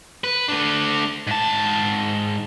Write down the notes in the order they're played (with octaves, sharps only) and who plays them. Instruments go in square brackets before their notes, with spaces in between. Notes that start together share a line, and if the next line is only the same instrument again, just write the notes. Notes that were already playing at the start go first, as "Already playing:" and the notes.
[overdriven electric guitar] B4
A3 D4
G#2 A5